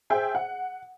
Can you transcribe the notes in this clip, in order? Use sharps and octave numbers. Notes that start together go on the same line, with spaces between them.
G#4 C5 E5 G5
F#5